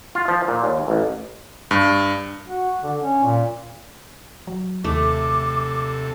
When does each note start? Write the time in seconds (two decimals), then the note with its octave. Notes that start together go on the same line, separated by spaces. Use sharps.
0.15 F4
0.28 F3
0.48 A#2
0.64 D#2
0.88 A1
1.71 G2
2.48 F#4
2.83 D3
3.00 C#4
3.23 A#2
4.47 F#3
4.84 D#2 C3 A3 A4 D6